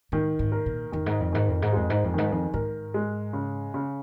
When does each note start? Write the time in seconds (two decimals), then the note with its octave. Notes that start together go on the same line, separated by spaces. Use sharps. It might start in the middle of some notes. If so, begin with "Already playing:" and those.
0.12 G#2 D#3
0.39 G#2
0.52 A#4
0.66 A#2
0.92 F2 D#3
1.06 G#2
1.20 F2
1.32 G#2 D#3
1.48 F2
1.62 G#2
1.73 F2 G#3
1.90 G#2
2.04 F2
2.14 G#2 D#3
2.32 F2
2.54 G#2 A#4
2.94 G#3
3.33 C#3
3.74 C#3